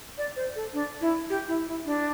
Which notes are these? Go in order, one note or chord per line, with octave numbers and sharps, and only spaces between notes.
D5
C5
A4
D4
E4
G4
E4
E4
D4